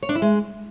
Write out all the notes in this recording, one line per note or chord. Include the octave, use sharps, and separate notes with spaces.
C#5
D4
E4
G#3